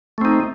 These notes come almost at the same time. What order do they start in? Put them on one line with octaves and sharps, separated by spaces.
A3 C4 D#4